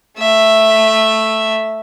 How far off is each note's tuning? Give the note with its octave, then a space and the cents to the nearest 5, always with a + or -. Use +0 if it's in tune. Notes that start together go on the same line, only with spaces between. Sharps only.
A3 +0 E5 +0